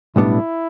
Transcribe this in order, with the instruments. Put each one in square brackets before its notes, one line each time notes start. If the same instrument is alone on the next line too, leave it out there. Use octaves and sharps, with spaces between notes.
[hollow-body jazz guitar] B1 A2 G3 B3 D4 [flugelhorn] E4